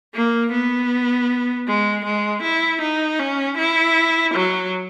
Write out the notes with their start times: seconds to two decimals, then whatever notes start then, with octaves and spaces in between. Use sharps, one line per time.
0.14 A#3
0.52 B3
1.67 G#3
2.05 G#3
2.43 E4
2.81 D#4
3.19 C#4
3.57 E4
4.34 F#3